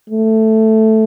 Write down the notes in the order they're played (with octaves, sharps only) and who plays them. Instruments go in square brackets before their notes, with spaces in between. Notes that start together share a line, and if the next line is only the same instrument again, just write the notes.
[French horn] A3